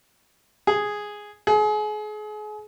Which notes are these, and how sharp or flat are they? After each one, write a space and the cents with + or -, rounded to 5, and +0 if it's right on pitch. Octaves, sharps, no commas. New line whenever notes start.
G#4 +0
G#4 +35